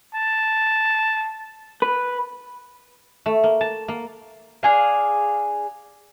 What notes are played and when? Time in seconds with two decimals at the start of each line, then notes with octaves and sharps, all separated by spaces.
0.15 A5
1.82 B4
3.26 A3
3.44 A#3
3.61 A5
3.88 A#3
4.63 D4 G#4 F5